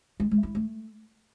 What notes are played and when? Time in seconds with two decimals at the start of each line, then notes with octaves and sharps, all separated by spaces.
0.20 G#3
0.31 G#3
0.43 E4
0.55 A3